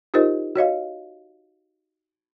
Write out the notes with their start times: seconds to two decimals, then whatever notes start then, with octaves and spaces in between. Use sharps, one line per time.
0.14 D#4 F4 G4 A#4 C5 D#5
0.56 F#4 C#5 D#5 F5